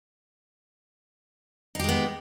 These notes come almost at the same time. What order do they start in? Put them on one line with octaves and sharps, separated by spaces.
D#4 G4 G#3 B3